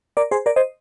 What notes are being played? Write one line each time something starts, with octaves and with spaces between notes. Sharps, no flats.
A#4 D5
G#4 C5
A#4 D5
C5 D#5